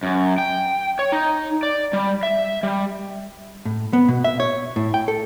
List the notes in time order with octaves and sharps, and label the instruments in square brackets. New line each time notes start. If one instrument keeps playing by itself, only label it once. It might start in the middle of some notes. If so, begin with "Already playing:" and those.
[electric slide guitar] F#2
G5
C#5
D#4
D5
G3
E5
G3
[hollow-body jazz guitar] A2
B3
B2
E5
C#5
A2
G5
A4